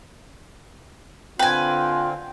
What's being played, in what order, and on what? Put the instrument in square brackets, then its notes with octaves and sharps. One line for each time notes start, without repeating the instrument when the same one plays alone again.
[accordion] D3 C4 [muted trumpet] F4 [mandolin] B4 G#5 [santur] G5